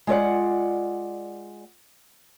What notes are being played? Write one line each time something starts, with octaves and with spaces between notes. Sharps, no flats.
G#3 F4 D5 F#5